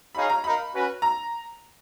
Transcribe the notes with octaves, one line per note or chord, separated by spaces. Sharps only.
D#4 G#4 C#5 F5 B5
A#5
D#4 A#4 F5 B5
C#4 F#4 B4
A#5